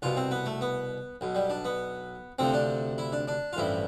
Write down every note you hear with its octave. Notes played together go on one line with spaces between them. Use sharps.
C2 B2 F4
C4
B3
A3
B3
B1 B2
G3
D4
B3
D2 C3 F3 C4
D4
E4
D4
D4
F4
A1 G2 F3 E4